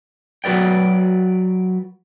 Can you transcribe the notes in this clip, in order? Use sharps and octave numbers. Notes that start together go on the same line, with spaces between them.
F#3 F#4 B4 D5 G5